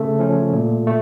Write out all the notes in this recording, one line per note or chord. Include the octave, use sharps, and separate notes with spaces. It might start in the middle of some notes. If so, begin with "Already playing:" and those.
Already playing: C#3 A3 A4
F3 C#4
A#2
A3